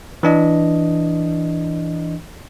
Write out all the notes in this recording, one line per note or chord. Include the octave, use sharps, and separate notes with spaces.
E3 D4 D#5